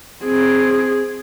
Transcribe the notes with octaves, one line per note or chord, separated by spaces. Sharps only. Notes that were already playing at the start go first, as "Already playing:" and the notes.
C4 G#4